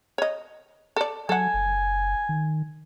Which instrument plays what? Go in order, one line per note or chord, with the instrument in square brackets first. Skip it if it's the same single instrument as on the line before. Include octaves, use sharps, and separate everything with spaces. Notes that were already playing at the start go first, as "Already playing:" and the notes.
[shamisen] C#5 D#5
A4 D5
[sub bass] F#3 [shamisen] A4 F#5 [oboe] G#5
[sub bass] F#1
D#3